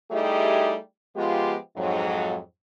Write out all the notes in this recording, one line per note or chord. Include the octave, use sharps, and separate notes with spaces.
G3 A3 D#4 E4 G4 G#4
F3 G#3 B3 F4 G4
F2 G#2 F#3